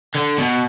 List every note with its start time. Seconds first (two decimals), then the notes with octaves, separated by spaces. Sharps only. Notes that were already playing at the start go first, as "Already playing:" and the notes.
0.15 D3
0.38 B2